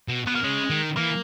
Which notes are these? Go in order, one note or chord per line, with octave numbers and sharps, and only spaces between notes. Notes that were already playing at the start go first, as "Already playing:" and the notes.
B2
B2 B3
A#3
C#3 G#3
D#3
E3 A#3